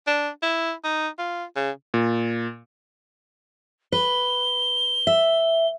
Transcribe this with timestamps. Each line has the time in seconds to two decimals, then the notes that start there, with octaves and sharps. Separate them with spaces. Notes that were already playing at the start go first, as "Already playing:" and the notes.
0.07 D4
0.43 E4
0.84 D#4
1.19 F4
1.56 C#3
1.94 A#2
3.92 B4 G7
5.07 E5